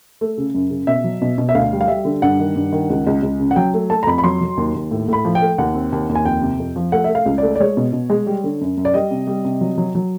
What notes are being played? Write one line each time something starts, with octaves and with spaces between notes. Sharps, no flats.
A3
C#3
F#2
C#3
B2 E5
F#3
B2
B2
E5
D2 F5
G3
F5
G3 E5
D3
G2 F#5
D#3
G2
D#3
C#2
C#2
C#2
C#3
F#5
F#3 G5
A3
A3 A5
A#5
F2 B5
B5
F#3 C6
F#3
D#2
D#2
A2
A2 B5
F3
G5
A3
D#2 F#5
C4
D#2
D#2
G#5
F2 G5
C3
F2
F3
A3 F#5
A3 E5
F5
C#2
A3 D5
D5
G#3 C#5
B2
B2
G#3
G3
D3
F#2
F#2
D5
G3 D#5
C3
G3
C3
F#3
F#3
F#3